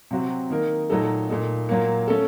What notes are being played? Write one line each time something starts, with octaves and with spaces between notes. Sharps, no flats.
C3 F#3 C4 F#4
D#3 A#3 D#4 A#4
A#2 F#3 A3 D#4 A4
A#2 A3 D#4
A#2 F#3 A#3
A3 C#4 A4